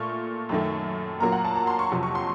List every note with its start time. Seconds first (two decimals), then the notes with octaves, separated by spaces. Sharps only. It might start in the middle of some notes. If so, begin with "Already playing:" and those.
Already playing: A#2 A3 C#6
0.49 F#2 D#3 A3
1.20 A#2 F#3 A#3 A#5
1.32 F#5
1.45 A5
1.55 A#5
1.67 C6
1.79 C#6
1.92 F2 C3 F#3
2.03 C#6
2.15 C6